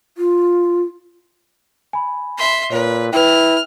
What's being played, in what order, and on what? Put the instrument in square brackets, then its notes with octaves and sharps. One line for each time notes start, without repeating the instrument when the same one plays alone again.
[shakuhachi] F4
[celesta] G#5 B5
[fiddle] E5 C6
[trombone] A#2 [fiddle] B4 [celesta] C#5
[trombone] E4 [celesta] B4 G5 [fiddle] F6